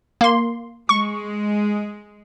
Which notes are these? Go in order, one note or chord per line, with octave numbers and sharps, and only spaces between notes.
A#3 C6
G#3 C#6